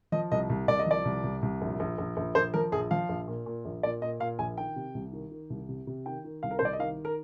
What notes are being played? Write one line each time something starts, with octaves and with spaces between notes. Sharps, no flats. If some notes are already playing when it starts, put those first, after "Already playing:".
F3 D#5
C2 D#5
C2
C2 D5
D#5
F3 D5
C2
C2
C2
A#1
A#1
A#1
A#1
A#1 C5
F3 A#4
A#1 G#4
F3 F5
A#1
A#2
A#2
A#1
A#2 D5
A#2 D#5
A#2 F5
A#1 G#5
D#3 G5
C3
C2
D#3
D#3
C2
C3
C3
D#3 G5
D#3
C2 F5
A#4
C5
C2 D5
D#5
D#3 F5
A#4